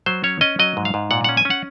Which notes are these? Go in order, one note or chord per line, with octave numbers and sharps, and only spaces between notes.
F#3 C5
C#4 C#5
C#4 D#5
F#3 D#5
G#2
F5
G#2
A#2 F#5
C#4 F#5
G#5
C#4
F#5